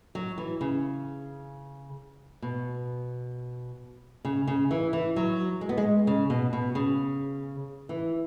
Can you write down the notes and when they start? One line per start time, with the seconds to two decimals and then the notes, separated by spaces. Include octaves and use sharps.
0.15 F#3
0.38 E3
0.61 C#3
2.42 B2
4.25 C#3
4.47 C#3
4.71 E3
4.93 E3
5.16 F#3
5.61 G#3
5.69 B3
5.78 G#3
6.07 C#3
6.30 B2
6.53 B2
6.75 C#3
7.89 E3